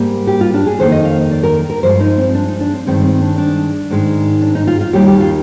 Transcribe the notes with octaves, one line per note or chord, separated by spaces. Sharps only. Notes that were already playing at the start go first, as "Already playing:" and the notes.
Already playing: G#2 G3 A#3
G4
F4
D4
G#4
F2 D#3 A#3 C5
D#5
F5
D5
A#4
A#4
G2 F3 G#3 C5
D#4
C4
D4
D#4
D4
C4
G2 D#3 G#3 C4
C4
D4
D4
G#2 D#3 G#3
D4
D#4
F4
F4
D#2 D#3 G3 A#3 G4
G4
F4